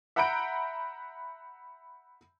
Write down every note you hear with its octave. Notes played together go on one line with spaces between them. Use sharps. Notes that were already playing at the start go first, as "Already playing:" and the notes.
E5 F#5 A#5 B5 G6 D7